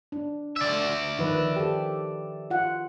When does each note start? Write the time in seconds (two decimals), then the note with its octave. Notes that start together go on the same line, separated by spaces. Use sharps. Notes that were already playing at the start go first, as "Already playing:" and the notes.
0.12 D4
0.56 D5 E5
1.19 D#3 F3 B4
1.56 G4 A4
2.50 F4 F#5